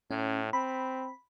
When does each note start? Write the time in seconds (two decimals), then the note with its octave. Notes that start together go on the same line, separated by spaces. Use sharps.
0.11 A2 C#4
0.53 C4 B5